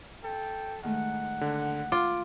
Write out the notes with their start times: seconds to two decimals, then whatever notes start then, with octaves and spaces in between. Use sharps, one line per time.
0.24 A4 G5
0.83 D#3 G#3 A3 F#5
1.41 D3
1.92 F4 D6